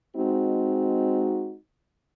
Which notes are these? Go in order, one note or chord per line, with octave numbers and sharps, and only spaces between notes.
G#3 C4 D#4 F#4